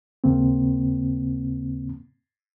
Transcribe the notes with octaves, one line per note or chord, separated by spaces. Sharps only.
D#2 C#3 A#3 C4